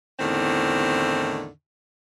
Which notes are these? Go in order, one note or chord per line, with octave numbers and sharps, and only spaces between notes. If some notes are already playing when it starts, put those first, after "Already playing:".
E2 A2 D3 D#3 C4